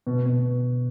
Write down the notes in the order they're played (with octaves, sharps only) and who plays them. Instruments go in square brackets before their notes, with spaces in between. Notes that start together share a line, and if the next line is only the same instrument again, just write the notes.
[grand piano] B2
B2